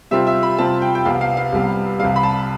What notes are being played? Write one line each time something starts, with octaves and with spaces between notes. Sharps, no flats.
C3 G3 C4 F4 E5
E5
B5
C3 G3 C4 F4 A5
G5
G5
C2 C3 G3 B3 F5
F5
F5
C2 C3 G3 B3
C2 C3 G3 F5
B5
A5